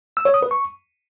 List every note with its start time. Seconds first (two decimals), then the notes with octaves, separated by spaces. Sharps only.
0.17 E6
0.25 C#5
0.34 D#6
0.42 B4
0.51 C#6